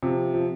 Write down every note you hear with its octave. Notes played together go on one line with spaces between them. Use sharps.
C3 F3
F3